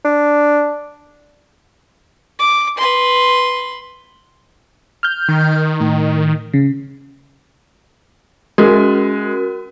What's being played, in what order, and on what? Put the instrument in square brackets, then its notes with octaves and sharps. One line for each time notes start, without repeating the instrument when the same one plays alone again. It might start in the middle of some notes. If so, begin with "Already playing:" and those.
[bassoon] D4
[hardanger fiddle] D6
B4 C6
[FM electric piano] F6 G6
[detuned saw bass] D#3
[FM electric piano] A2
C#3
[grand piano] G#3 [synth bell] C#4 F#4 A#4